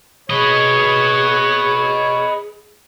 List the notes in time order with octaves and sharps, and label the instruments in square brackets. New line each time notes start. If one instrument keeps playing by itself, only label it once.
[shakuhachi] G#4 [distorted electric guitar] B4 D#5 [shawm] C#5